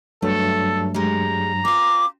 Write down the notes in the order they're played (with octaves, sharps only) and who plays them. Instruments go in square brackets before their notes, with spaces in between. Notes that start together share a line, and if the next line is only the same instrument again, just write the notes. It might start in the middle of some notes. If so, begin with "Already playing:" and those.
[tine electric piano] G2 F#3 [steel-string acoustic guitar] A3 [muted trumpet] A4
[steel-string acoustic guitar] G3 G#3 [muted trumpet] A#5
[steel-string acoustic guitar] C4 F4 [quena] D6